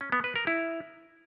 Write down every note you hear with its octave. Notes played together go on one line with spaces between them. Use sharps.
C#4
B3
B4
A#4
E4